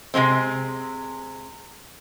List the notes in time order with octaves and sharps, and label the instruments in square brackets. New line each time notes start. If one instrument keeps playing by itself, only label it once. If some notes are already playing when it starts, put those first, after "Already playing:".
[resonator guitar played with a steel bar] C3 F#3 G#3 C4